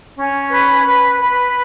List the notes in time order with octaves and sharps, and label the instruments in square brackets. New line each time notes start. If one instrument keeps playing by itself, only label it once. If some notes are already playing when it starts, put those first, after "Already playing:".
[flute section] C#4
B4
B4
B4